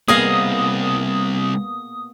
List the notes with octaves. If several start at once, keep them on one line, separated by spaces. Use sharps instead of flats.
C2 A#3 B3 G#4 D#5 F5 D#6